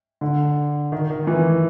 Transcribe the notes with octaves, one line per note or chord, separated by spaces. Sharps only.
D3
D#3
D#3
E3